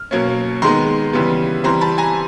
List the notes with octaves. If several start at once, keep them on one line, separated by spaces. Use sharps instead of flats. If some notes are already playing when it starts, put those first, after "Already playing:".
Already playing: F6
B2 F#3 A#3 C#4
D#3 G#3 B3 A#5 C6
C#3 E3 G3 B3
E3 G3 C4 A#5 C6
A5 B5
G#5 A#5